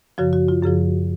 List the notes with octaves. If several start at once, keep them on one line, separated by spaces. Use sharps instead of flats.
F#2 C#3 F3 F#4
F#4
F4
F#2 C#3 F3 G#4